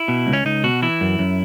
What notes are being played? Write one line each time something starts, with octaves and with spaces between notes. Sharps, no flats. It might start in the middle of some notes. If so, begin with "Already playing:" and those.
Already playing: E4
B2
C#2
C#4
C#2 D#4
B2 F#4
E3 E4
F#2
F#2